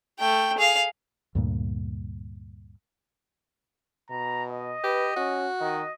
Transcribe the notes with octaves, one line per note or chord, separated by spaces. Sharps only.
A3 G5
G#4 F5
D2 G2 A#2
B2 A#5
D#5
G4 B4
C#4 F#4
D#3 D#5